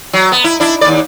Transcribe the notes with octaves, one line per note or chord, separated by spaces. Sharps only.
F#3
B3
E4
D4 E4
D#2 D5